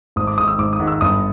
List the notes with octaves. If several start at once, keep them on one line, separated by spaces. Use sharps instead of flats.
G#1 D#6
D6
G#2 D#3 D#6
E6
G#1 D6
D#6
G#2 D#3
E6
G1 D#6